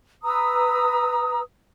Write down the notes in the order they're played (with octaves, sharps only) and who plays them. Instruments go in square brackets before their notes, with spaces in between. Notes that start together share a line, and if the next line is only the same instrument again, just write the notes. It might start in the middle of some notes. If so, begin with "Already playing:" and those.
[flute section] B4 A#5 D#6 E6